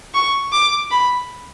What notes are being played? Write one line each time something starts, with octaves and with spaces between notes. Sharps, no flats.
C#6
D6
B5